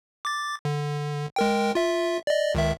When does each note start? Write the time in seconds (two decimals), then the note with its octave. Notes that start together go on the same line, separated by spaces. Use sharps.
0.25 D6 A6
0.65 D3
1.36 G#3 A#4 G5
1.75 F4 E5
2.27 D5 D#5
2.55 C#2 D#3 E5